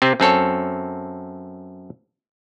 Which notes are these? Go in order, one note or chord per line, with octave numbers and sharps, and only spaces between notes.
C3 C4
F#2 C4 A4 C#5